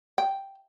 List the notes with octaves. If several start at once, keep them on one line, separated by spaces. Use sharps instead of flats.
G5